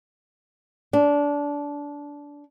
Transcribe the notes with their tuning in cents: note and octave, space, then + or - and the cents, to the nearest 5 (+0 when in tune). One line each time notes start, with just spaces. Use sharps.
D4 -20